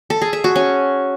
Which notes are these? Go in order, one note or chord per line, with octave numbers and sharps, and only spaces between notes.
A4
G#4
E5
F#4
C#4